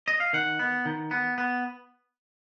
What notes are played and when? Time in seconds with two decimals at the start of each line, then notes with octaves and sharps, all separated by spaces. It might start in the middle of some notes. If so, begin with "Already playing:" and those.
0.08 D#5
0.20 F5
0.33 D#3 F#5
0.59 B3
0.85 D#3
1.11 B3
1.38 B3